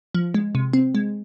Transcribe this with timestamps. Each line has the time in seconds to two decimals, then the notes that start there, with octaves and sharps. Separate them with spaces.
0.14 F3
0.35 G#3
0.55 C3
0.73 C4
0.95 G#3